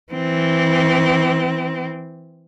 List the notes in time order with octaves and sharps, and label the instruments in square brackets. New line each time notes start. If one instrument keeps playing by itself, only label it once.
[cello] E3 C4